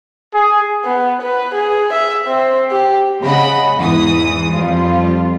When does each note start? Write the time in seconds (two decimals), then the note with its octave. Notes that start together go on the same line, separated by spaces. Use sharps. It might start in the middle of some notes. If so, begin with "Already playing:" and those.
0.34 G#4
0.85 B3
1.22 B4
1.55 G#4
1.93 E5
2.28 C4
2.71 G4
3.21 C#3 D#5 F#5 B5
3.78 E2 G#2 E3 D#6
4.55 F2 G3 F4